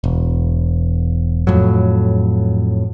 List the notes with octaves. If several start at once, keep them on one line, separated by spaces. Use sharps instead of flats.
E1
F2 A2 F#3